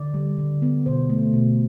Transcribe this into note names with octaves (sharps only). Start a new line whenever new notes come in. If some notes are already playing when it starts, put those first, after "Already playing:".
Already playing: D3 D5
G3
D3
B3
B2 C5
A3
B2